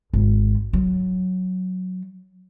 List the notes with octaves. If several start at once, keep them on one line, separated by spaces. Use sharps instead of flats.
G#1
F#3